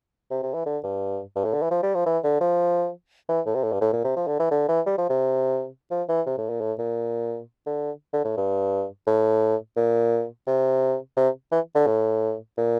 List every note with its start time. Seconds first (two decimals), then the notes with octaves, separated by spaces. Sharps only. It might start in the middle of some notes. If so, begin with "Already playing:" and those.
0.31 C3
0.43 C3
0.54 E3
0.66 D3
0.83 G2
1.36 G2
1.45 A2
1.54 D3
1.62 E3
1.71 F3
1.83 G3
1.94 F3
2.06 E3
2.24 D3
2.41 F3
3.29 E3
3.46 A2
3.55 C3
3.64 A2
3.73 G2
3.81 A2
3.93 A#2
4.04 C3
4.16 F3
4.27 D3
4.40 E3
4.51 D3
4.69 E3
4.86 G3
4.98 F3
5.10 C3
5.91 F3
6.09 E3
6.26 C3
6.38 A2
6.50 A#2
6.61 A2
6.79 A#2
7.66 D3
8.13 D3
8.25 A2
8.37 G2
9.07 A2
9.76 A#2
10.47 C3
11.17 C3
11.52 E3
11.75 D3
11.87 A2
12.57 A#2